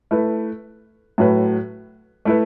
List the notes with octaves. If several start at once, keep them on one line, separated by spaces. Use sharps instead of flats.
A3 E4 B4
A2 F#3 A3 F#4 B4
A3 E4 B4